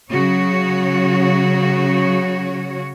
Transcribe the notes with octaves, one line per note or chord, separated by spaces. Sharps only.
C#3 F#3 F#4 C#5